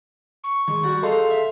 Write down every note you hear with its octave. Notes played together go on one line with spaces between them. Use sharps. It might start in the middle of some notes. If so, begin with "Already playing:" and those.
C#6
D#3 G#3
G3 F#4
D#4 G#4 A4 F5 C6
E5